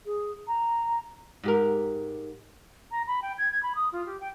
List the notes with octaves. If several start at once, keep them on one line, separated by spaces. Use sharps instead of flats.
G#4
A#5
G#2 G4 A#4
A#5
B5
G5
G#6
G#6
B5
D#6
F4
G4
G5